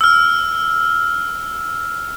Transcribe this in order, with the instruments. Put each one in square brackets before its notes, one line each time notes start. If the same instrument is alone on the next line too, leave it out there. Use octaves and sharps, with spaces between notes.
[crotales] E6 F6